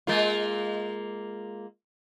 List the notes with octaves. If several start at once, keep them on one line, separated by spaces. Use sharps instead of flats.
G#3 A#3 F4